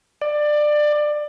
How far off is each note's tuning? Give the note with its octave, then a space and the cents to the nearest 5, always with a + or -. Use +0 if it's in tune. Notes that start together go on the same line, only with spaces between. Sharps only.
D5 +20